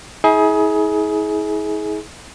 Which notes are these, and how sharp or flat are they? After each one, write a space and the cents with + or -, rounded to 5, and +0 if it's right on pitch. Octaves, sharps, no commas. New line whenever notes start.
E4 -45 G#4 +20